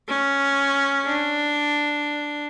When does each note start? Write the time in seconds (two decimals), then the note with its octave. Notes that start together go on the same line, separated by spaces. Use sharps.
0.08 C#4
1.06 D4